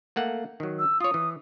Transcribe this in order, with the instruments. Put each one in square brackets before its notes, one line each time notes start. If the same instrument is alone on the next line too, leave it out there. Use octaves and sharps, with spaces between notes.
[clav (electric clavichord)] A3 A#3 F#5
D#3 F#3
[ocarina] E6
[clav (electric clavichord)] F4 C#5 [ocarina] D#6
[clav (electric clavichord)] E3